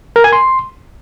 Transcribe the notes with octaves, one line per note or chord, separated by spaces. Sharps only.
A#4
G#5
C6